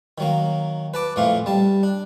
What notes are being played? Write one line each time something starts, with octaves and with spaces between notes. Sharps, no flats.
D#3 F#3 A#3
B4 A5 D6
F2 A#2 E3 A3 F5
G3 A5
D4